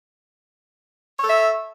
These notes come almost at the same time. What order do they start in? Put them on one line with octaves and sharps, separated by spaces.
C#5 A4 E5